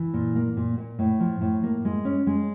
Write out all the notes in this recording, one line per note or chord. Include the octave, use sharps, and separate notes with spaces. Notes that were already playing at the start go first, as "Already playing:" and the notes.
Already playing: E3
A#2
A#3
A#2
A#2
A2
F3
A2
A#3
G#3
C#4
G#3